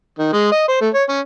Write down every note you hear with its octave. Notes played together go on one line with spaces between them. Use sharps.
D#3
G#3
D#5
C5
A3
C#5
C#4